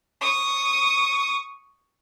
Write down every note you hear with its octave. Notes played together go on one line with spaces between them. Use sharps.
C#6 D#6